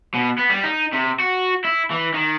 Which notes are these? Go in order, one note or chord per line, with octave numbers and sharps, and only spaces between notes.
B2
B3
G3
D#4
C3
F#4
E4
E3
D#3